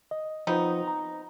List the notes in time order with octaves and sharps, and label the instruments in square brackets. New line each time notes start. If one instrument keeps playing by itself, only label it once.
[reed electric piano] D#5
[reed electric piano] F3 F4 C5 [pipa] B3 C4 D#4
[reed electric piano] A#5